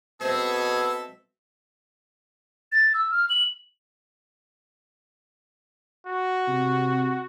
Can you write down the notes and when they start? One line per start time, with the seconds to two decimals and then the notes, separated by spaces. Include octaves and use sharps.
0.21 B2 C4 G#4 A4 C5 E5
2.72 A6
2.94 E6
3.12 F6
3.30 F#7
6.07 F#4
6.48 C3